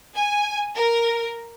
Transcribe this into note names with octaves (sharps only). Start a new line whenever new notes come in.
G#5
A#4